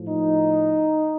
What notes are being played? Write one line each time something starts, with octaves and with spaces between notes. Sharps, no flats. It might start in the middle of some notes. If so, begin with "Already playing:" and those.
Already playing: A2 F3
D#4